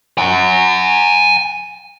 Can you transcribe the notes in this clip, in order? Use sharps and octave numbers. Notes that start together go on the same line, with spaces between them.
F#5 G#5